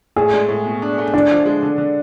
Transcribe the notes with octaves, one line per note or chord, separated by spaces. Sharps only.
A2 G#4
G#3
A2
B2
D4
A3
D3 D4
F3
G#3
D3
D3